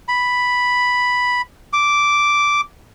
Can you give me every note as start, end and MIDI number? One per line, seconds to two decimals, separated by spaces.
0.08 1.41 83
1.73 2.61 86